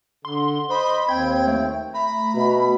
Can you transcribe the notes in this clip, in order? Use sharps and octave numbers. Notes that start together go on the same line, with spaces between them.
D3 C6
C5 D#5 B5 C6
D#2 C4 G5 G#6
A3
A#5 B5
B2